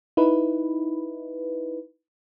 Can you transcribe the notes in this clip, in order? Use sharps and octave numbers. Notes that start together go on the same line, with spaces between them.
D#4 E4 B4